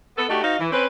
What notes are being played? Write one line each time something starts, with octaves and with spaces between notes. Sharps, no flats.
B3 A4
A3 D4 D#4 F#4 G4
D#4 F#4 C5 D#5 F5
E3
C4 C#4 B4